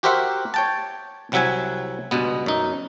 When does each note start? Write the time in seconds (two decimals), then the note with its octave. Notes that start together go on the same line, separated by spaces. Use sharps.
0.03 F#4 G4 A#4 C5 E5 F#5
0.54 C#5 G5 A5
1.32 C2 C3 F#3 E5 F#5 G#5
2.11 C#2 G2 B2 B3
2.46 F#2 D#4